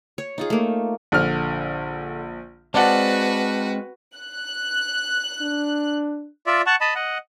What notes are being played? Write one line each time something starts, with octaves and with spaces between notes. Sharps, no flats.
C#5
D#4 F4 G#4
A3 A#3
A#1 D3 F6
G#3 C4 F#4 B4 D5 F5 F#5 A5
F#6
D4
F4 D5 E5
F#5 A5 C#6
D#5 A5 B5
D#5 F#5